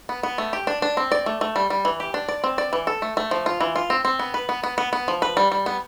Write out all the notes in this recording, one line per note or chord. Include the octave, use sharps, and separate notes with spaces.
B3
B3
A3
G4
D4
D4
C4
D5
A3
A3
G3
G3
E3
G4
D4
D5
C4
D5
E3
A4
A3
A3
F3
F4
E3
F4
C4
C4
B3
B4
B3
B3
B3
B3
F3
B4
G3
G3
B3